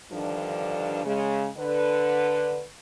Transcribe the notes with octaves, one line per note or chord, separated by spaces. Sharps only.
G2 D3 D#3 F3 D4
C#3 G#3
D3 B4